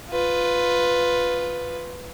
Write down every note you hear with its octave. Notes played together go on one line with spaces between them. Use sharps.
F4 B4